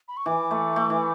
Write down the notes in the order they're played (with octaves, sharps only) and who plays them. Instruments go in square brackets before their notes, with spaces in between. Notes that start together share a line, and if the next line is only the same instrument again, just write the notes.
[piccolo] B5
C#6
[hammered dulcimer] E3 [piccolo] D6
[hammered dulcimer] A3
A3
E3